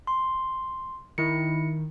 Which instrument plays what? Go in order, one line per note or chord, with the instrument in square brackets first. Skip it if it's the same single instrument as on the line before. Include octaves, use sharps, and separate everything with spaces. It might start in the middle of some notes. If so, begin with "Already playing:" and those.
[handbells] C6
[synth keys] D#3 [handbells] E4 C#7